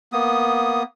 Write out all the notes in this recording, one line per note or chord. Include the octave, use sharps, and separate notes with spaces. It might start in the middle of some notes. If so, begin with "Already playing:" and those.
A#3 B3 D#6